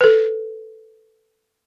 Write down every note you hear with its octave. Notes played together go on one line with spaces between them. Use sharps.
A4 B4